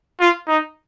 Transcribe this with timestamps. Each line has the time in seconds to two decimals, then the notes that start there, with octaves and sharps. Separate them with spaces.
0.20 F4
0.48 D#4